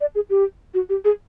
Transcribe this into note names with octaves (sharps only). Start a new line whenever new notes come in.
D5
G#4
G4
F#4
G4
G#4